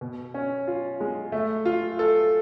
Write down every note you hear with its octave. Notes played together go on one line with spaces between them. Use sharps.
B2
C#4
F4
G#3
A3
F4
A4